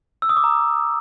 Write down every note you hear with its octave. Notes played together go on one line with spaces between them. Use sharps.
E6
D#6
D6
A#5